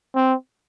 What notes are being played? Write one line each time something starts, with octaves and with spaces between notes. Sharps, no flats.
C4